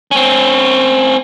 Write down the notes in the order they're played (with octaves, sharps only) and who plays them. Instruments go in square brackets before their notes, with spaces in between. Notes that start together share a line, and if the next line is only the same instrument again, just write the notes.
[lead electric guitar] C4 C#4